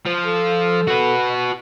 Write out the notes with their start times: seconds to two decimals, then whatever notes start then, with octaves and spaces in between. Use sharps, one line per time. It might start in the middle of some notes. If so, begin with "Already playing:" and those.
0.06 F3
0.24 A4
0.88 F#4 B4